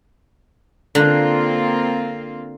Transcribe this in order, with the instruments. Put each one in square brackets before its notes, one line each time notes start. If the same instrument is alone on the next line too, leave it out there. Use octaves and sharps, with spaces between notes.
[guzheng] D3 [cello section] A#3 C4 F4